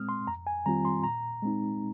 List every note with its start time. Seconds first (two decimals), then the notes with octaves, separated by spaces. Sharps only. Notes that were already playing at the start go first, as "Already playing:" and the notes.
Already playing: A#2 G#3 C4 D#6 F6
0.09 C6
0.27 F2 A#5
0.47 G#5
0.66 D#3 G3 C4 F4 A#5
0.85 C6
1.04 A#2 A#5
1.42 G#3 C4 D#4